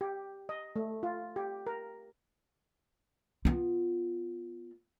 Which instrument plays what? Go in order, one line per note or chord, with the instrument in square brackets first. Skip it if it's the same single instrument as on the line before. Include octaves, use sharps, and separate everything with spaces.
[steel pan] G4
D#5
A3
F4
G4
A#4
[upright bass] B3 F4